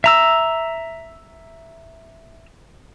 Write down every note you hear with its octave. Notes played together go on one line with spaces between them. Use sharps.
E5 A#5 E6